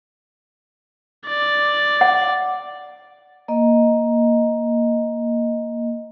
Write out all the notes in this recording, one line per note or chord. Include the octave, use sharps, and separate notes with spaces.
D5
F#5
A#3 D#5